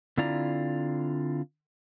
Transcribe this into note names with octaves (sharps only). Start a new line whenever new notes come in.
D3 C4 E4 F4 D5 A#5